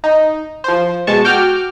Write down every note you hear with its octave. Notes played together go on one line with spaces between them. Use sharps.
D#4
F3 C5
B2 G#3 A5 C#6
F#4 G5 D6 F6